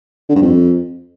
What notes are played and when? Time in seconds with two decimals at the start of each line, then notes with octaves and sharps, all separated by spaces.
0.29 D3
0.36 G2
0.42 F2